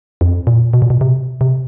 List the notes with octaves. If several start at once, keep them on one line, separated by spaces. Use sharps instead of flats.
F2
A#2
B2
A#2
B2
C3
C3